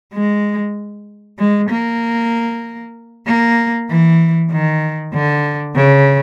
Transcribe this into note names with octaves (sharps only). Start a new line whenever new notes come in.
G#3
G#3
A#3
A#3
E3
D#3
D3
C#3